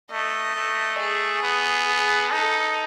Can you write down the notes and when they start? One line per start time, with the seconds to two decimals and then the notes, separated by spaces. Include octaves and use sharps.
0.12 A3 D#5
0.56 A3
0.99 G#4
1.43 B3
1.88 G#4
2.31 D#4 A4